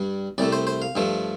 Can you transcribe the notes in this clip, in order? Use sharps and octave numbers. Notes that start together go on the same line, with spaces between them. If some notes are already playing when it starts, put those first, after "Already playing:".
Already playing: G2 G3
C2 C3 A3 D5
C5
C5
F5
G2 F3 A3